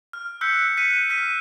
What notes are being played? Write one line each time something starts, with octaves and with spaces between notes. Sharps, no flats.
F6
E6 F#6 G6 B6 C#7
F#6 B6 C#7 D#7
F6 B6 D#7